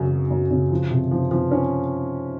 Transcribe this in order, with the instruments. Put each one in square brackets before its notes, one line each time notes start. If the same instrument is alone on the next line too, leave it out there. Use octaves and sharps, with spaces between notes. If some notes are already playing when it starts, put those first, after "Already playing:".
Already playing: [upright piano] F#2 C#3 F#3
F#3
F#2
C#3
F3
C3
F3
F3
C#4